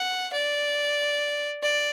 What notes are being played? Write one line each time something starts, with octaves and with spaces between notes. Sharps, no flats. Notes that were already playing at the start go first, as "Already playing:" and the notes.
Already playing: F#5
D5
D5